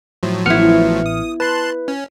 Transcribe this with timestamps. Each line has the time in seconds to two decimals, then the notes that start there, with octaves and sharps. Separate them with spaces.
0.23 A2 F3 F#3
0.46 A1 B3 E4 F6 C#7
1.06 D#6
1.40 B4 A5 C6 F#6
1.88 C#4